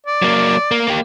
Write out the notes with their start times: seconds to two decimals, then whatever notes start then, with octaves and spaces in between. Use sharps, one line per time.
0.06 D5
0.22 F#3 A#3
0.71 A#3
0.88 A#3 G4